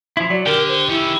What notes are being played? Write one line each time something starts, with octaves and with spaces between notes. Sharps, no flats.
F3 E4
F#3 D5
D3 G4 A#4 G5
C5
D#3 C#4 E4